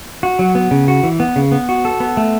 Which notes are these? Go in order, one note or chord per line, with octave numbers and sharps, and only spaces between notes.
F#4
F#3
B3
C#3
F#4
E3
B3
C#3
B3
F#4
A4
B3
A3